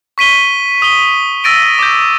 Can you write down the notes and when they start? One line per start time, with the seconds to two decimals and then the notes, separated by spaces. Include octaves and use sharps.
0.18 C#6 B6 D#7 G7
0.82 D#6 G7
1.44 E6 A6 A#6 D7 D#7
1.79 D6 G6